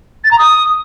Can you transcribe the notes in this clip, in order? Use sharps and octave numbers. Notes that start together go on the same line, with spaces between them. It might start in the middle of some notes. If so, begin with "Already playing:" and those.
A6
A#5
D#6